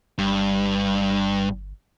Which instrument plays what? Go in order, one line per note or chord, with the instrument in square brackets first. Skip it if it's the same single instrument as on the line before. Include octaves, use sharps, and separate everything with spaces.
[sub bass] G1 [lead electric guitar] G2